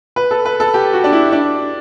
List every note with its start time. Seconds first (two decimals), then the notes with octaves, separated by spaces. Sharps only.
0.16 B4
0.31 A4
0.45 B4
0.60 A4
0.74 G4
0.93 F#4
1.04 D4
1.13 E4
1.32 D4